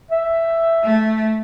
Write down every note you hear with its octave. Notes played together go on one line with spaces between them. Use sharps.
E5
A3